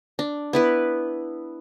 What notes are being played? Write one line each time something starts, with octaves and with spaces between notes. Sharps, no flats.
D4
B3 E4 B4